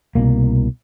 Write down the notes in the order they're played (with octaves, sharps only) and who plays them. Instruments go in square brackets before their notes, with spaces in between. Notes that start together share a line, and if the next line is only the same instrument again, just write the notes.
[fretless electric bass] C2 B2 A#3